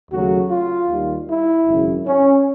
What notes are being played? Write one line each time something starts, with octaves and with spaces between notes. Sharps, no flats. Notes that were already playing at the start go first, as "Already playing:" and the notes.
D#2 C#3 F#3 A3 F#4
F4
D#2 D#3 G3
E4
G#1 F#2 C#3
C#4